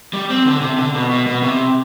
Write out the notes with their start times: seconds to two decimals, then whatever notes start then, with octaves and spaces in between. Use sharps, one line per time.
0.13 G3
0.30 C4
0.46 D3
0.62 C3
0.78 D3
0.95 B2
1.11 B2
1.27 B2
1.43 C3